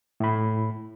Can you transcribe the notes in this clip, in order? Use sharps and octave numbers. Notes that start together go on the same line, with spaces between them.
A2 B5